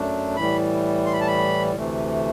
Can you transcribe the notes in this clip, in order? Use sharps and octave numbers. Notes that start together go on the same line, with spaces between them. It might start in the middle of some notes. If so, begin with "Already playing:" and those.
Already playing: F#2 F#3 A3 D4
A2 E3 G3 B5
C6
B5
A5
B5
D2 C3 E3 A3